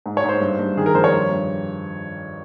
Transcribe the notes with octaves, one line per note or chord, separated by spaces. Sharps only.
G#2
C#5
G#2
C5
G2
G2
D#3 G#4
A#4
F2 C5
C#5
G2
G2